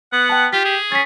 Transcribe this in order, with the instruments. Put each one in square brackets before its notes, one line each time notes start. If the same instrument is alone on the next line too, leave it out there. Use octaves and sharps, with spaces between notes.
[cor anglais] B3 [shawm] F#5
[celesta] G5 A5
[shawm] F4 [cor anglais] G4 [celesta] B6
[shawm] G#4
[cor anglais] C#4 [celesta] A6 B6